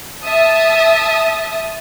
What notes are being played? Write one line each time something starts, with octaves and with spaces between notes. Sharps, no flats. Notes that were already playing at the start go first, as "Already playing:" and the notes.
E5 A5 D#6